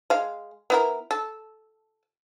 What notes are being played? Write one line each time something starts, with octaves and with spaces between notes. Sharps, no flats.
G#3 F5
B3 E4 A#4
A4